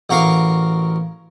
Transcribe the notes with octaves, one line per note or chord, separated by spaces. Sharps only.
A1 F#4 A#4 F5 D6